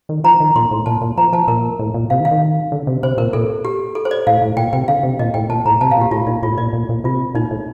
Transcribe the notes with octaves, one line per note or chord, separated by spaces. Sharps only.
D#3
F3 A#5
D#3
A#2 C6
A2
A#2 A5
A#2
F3 A#5
F3 A5
A#2 A#4
A2
A#2
C3 F5
D#3
F5
D#3
D3
C3
C3 C5
A#2 A#4
A#2 A4
G4
A4
C5
D5
A2 F5
A2
A#2 G5
C3 G5
D3 F5
C3
A#2 D#5
A2 G5
A#2 A5
A2 A#5
C3 A5
F5
A#2
G4
A2 F4
A#2 D#4
A2 F4
A#2 D5
A#2
A#2
C3 F4
A#2 D#4
A2